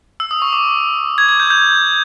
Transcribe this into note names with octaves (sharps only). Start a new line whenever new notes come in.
E6
D#6
C#6
D6
G#6
G#6
G6
G6